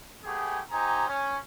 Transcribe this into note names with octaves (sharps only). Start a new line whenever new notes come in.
A3 B3 G4 G#4
D#4 G4 C5 G#5 A#5
C#4